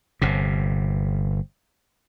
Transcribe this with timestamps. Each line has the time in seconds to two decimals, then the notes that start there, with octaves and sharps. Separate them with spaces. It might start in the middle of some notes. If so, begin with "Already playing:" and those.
0.22 G1 C3